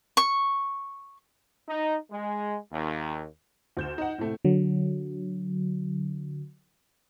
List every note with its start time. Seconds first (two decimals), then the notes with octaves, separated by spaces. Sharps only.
0.17 C#6
1.69 D#4
2.12 G#3
2.72 D#2
3.77 D2 G6 E7
3.98 D#4 F#5
4.18 A2 C3 A3
4.44 D3 F#3